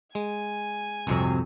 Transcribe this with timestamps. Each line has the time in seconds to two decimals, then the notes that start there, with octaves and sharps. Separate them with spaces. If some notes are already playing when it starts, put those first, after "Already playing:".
0.15 G#3 G#5
1.07 C2 F2 G#2 C3 F#3